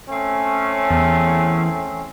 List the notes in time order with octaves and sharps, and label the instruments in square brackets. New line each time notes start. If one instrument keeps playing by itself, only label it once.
[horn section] A3 C4 C#4
[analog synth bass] E2